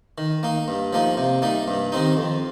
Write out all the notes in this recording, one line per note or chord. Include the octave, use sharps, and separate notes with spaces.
D#3
A#3 D#4
G2
F3 A#3 D#4
C3
G3 A#3 D#4
G2
D#3 C4 D#4
F2